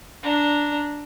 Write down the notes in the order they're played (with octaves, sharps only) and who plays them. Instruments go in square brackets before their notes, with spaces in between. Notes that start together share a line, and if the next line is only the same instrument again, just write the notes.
[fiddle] D4 A#5